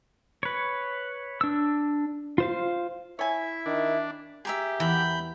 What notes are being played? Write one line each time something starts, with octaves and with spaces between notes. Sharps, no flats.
B4 C#5
D4 E6
F4 C5 F5
E4 C#5 E5 G#5
D#3 D4
G4 G#4 A#4 E5
E2 E3 B5 G6